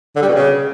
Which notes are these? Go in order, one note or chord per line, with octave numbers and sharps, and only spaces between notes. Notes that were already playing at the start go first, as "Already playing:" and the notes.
D3
G3
B2
C#3